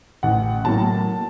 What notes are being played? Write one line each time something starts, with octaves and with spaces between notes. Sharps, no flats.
A1 F#5
A2 F#3 A#3 A5